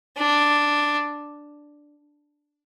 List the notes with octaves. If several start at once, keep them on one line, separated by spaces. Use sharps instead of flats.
D4